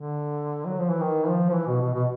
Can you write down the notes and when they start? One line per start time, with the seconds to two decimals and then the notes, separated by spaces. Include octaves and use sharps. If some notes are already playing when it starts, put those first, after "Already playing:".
Already playing: D3
0.66 F#3
0.78 F3
0.90 E3
1.01 D#3
1.27 F3
1.49 F3
1.54 E3
1.67 B2
1.81 B2
1.94 B2